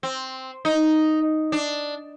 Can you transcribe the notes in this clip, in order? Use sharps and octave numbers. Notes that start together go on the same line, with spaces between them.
C4
D#4
D4